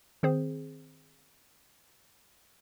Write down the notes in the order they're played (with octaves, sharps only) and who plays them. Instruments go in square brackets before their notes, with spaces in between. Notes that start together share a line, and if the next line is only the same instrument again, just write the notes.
[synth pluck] D#3 C4 G#4 C5